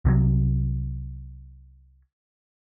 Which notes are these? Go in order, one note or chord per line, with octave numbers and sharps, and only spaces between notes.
C2 C3 E3 F#3